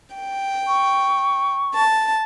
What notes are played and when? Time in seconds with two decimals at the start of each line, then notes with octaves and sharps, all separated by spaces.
0.15 G5
0.68 C#6
1.73 A5